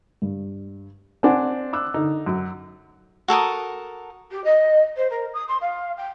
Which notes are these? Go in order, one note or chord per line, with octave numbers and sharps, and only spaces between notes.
G2
C4 D4 F#5 G#5
D6 E6 F#6
D3 D#4
F#2
F#4 A4 A#4 D#6
G4
D#5
C5
A#4
D#6
C6
F5
G5